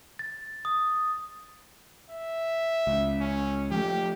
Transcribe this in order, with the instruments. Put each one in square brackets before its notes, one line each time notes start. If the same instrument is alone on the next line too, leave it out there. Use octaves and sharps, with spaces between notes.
[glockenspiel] A6
D#6
[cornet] E5
[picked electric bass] C#2
[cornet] C#4
[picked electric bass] F3 A3 [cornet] G4